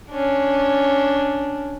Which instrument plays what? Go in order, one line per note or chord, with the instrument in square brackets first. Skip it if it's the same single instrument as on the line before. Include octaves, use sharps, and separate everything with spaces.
[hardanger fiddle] C#4 D4